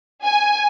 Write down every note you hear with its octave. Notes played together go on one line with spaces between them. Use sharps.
G#5